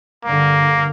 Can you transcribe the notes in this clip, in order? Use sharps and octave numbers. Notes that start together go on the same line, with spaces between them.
G2 D3 A#3